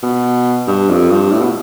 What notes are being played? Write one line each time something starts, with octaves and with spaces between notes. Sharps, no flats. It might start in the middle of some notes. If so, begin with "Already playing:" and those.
B2
G2
F2
G2
A2
B2